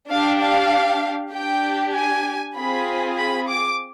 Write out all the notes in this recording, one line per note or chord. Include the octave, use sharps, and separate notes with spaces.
D4 G4 F5
F5
D4 G4 G5
G#5
C4 F4 G#4 B5
B5
D6